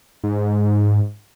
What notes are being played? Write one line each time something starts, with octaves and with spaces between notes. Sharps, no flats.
G#2